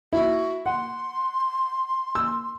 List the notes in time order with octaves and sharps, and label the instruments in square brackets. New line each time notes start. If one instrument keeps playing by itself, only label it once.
[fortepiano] E4 [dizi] F#4
[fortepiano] F#5 [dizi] C6
[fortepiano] E6